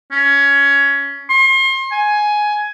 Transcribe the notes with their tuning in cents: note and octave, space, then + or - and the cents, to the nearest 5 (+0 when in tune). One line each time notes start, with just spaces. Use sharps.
C#4 +15
C6 +35
G#5 +10